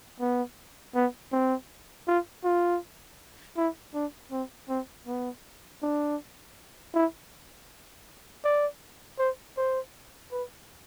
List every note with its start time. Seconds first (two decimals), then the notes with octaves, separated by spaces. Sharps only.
0.20 B3
0.95 B3
1.32 C4
2.07 F4
2.44 F4
3.57 E4
3.94 D4
4.31 C4
4.69 C4
5.07 B3
5.83 D4
6.94 E4
8.44 D5
9.19 C5
9.57 C5
10.32 B4